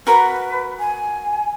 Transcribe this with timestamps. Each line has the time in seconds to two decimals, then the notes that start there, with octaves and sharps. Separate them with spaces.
0.07 F#4 A#4 B4 B5
0.79 G#5